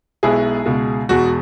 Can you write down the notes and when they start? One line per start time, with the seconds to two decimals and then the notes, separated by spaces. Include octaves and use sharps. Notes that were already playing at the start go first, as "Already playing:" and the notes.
0.23 B1 B2 G#3 B3 E4 G#4
0.66 C#2 B2 G#3
1.09 E1 E2 B2 G#3 F#4